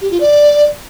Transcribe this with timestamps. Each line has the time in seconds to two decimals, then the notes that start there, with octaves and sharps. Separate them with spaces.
0.01 G4
0.11 F4
0.20 D5